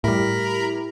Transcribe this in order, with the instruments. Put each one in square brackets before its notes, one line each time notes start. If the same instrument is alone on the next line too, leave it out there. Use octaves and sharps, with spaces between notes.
[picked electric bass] A2 G3 [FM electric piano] E4 G4 [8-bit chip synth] A#4 A#5 B5